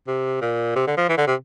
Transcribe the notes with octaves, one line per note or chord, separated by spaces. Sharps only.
C3
A#2
C3
D3
F3
E3
D3
C3